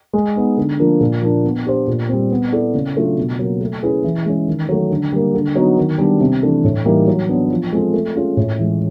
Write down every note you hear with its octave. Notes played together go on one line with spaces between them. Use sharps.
G#3
B3 D#4
D3
F3 A#3 D4
A#2
F3 A#3 D4
B3
D4 G4 C5
A#2
G3 C4
B3
E4 A4 D5
C#3
F#3 A3 D4 F4
B2
F#3 A#3
A3
C#4 E4 G#4 B4
E3
G#3 C#4
D#3
F#3 A3
D3
G3 A#3
D3
F#3 B3 D#4 F#4
D#3
G3 B3 D4
C3
E3 A3 D4
A2
E3 G3 A#3 D#4
F#3
B3 D4
F3
G#3 C4 F4 A4
A3
C#4 F4 G#4
A2
E3 G#3